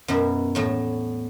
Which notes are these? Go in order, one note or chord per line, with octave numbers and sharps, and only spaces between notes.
F#2 B2 E4
E2 A2 A3